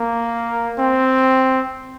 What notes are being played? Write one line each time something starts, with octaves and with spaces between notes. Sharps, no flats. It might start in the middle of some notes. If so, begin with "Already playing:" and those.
Already playing: A#3
C4